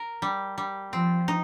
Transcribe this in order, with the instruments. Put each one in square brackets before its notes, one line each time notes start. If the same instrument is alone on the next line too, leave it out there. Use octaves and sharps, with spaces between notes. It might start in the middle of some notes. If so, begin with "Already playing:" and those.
Already playing: [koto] A#4
G3
G3
[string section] F3 [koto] C4
[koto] D#4